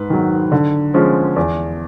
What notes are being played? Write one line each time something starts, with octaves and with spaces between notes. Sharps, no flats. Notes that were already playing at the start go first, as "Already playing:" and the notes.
Already playing: G#2 B4
D#3 F#3
D3
F3 G#3 C#4
E2